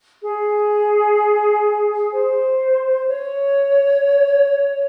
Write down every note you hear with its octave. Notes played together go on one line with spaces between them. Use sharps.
G#4
C5
C#5